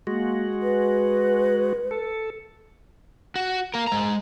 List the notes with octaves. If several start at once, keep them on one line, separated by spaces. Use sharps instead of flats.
G#3 A#3 F#4
B4
A4
F#4
A#3 A#4
G#3 A#5